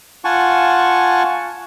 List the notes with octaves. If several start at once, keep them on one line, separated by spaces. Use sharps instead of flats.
F4 F#5 G#5 A5 C#6